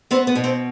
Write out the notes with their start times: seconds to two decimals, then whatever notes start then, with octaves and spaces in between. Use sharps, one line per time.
0.11 B3 C4
0.27 B3
0.35 B2
0.44 C4